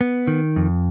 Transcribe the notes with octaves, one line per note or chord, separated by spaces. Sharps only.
B3
D#3
F2